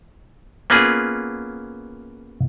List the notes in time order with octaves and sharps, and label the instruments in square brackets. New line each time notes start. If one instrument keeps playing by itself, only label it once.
[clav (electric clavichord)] A#3 B3 C#4 F4 G#4